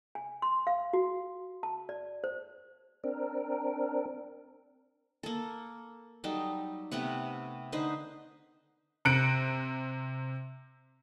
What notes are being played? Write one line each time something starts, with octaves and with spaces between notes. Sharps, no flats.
G#5
C6
F5
F#4
A5
D5
C5
C4 D4 A#4
A#3 A4
F#3 G3 D#4 A4
C3 A3 B3 F#5
D3 D#4 B4 C5
C3 F#6 C#7 D7